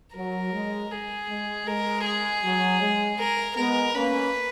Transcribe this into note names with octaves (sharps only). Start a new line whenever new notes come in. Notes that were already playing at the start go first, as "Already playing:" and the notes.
F#3 A#4
G#3
G#4
G#3
G#3 A#4
G#4
F#3
G#3
A#4
G#3 B3 A#4
A#3 C#4 B4